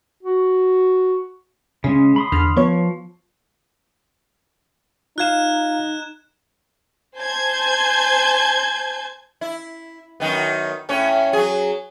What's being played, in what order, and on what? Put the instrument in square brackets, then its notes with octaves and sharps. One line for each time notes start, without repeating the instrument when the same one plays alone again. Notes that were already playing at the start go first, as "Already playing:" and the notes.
[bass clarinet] F#4
[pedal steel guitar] C#3 G#3 [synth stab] C#4
[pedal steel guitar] B5 C6 D#6
[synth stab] E2 D3 F6
[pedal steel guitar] F3 [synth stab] B3 C#5
[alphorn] D#4 [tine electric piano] F4 F5 [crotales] F#6 G#6 E7
[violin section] C5 G#5 A5 G6 G#6
[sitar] E4
F#2 D#3 B3
A2 C#4 C#5
F#3 G#4